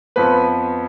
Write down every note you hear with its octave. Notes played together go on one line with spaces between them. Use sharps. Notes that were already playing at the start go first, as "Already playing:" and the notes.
F2 F3 B3 B4